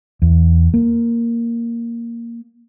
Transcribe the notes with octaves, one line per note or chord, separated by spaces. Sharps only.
E2
A#3